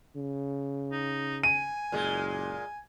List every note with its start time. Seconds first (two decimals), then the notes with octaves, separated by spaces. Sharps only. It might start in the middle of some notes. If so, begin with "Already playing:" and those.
0.16 C#3
0.92 D#4
1.43 G#5 D#7
1.92 F#1 A#2 G#3
2.27 G#5